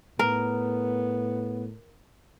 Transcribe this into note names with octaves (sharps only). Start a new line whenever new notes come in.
A2 B3 A#4